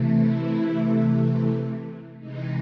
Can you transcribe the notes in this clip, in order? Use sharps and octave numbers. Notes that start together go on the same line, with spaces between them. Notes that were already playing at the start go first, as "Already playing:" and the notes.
Already playing: C3 E3 A3
E4
C3 E3 G#3 D#4